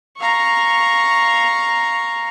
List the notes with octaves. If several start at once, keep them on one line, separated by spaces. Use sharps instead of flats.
F5 A#5 C#6